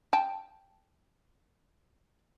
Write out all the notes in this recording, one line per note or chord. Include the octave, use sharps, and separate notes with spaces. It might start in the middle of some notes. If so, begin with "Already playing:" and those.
G5 A5